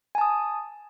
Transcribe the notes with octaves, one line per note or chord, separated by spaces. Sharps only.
G#5 A5 D#6